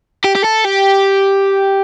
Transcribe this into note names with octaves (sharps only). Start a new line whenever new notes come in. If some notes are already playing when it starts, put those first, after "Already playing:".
G4
G4
A4
G4